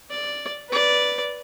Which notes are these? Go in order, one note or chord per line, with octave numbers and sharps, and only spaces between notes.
D5
B4 D5